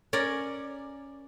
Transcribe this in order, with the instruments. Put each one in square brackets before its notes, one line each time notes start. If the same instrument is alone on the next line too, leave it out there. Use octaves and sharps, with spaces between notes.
[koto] C#4 A#4 D5